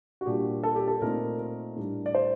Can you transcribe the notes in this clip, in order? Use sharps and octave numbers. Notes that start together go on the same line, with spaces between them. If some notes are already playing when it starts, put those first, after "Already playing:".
F#4
A#2 G3 D4 G4
A4
G4
A4
A#2 A3 C4 D#4 A#4
A#4
A2 G3 D4
D5
C5